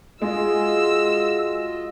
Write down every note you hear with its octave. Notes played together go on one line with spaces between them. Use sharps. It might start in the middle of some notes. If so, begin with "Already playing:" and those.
G#3 F4 F#4 G#4 D#5 E6